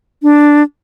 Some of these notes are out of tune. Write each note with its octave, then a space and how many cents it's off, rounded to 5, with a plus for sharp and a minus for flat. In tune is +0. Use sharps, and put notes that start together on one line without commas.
D4 +0